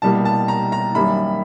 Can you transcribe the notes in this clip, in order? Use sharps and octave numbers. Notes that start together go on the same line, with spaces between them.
C2 B2 G3 A#3 A5
A5
A#5
A#5
F#2 D#3 G3 A#3 B5